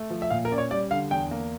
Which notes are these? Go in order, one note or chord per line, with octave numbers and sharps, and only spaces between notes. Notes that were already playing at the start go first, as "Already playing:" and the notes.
Already playing: A3
F3
E5
A#2 F5
A#4
C#4 D5
C#5
G3 D5
D3 F5
E2 G5
A#3